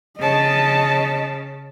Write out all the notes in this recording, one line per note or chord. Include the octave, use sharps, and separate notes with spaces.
C#3 D#5 A5